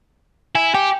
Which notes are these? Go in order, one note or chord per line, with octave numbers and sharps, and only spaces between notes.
E4 G#5
G4 G5